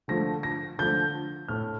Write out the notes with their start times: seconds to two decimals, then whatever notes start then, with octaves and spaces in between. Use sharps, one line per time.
0.08 D3 F3 A3 A#6
0.43 A#6
0.78 D3 F3 A3 G6
1.48 A2 A3 F6